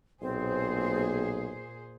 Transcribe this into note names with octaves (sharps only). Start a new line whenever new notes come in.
B1 A#2 C4 G#4 C5